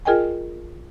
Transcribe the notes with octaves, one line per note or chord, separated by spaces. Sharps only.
F4 G#4 A#4 D#5 G5 G#5